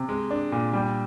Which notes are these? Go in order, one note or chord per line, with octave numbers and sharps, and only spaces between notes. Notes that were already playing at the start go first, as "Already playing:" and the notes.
Already playing: C3
G#3
D4
A#2
G3